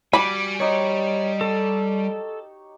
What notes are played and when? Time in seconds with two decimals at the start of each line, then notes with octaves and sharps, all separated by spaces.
0.13 G3 F#4 G#5 B5 D6
0.60 D#4 G4 C5 C#5
1.41 A4 C#5